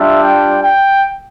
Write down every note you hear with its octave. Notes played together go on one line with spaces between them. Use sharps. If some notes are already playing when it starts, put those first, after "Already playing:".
Already playing: G3 D4 F4 E5
G5
G5